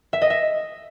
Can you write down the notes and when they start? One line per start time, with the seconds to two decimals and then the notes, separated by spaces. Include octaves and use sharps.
0.13 E5
0.22 D#5
0.30 E5